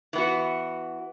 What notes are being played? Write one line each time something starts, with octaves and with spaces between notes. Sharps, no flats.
E3 B3 F#4